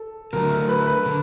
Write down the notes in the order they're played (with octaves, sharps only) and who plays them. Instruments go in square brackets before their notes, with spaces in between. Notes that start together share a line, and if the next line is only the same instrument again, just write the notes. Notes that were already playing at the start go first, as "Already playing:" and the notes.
Already playing: [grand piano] A4
[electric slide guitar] D3 F#3 A3 [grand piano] A#4
[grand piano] A#4
B4
B4
[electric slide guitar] D3